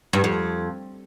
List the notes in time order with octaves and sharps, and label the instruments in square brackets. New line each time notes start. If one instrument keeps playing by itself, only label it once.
[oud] G2
F2